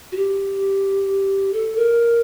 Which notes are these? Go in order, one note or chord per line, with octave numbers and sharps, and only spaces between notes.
F#4
G4
A4
A#4